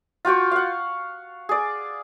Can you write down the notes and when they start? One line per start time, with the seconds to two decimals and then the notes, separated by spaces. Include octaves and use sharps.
0.25 F4 F#4 G5 C#6
0.51 F5 F#5
1.49 G#4 D5